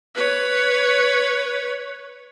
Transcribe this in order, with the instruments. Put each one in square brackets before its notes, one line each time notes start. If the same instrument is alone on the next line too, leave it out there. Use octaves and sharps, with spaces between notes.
[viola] B4 C#5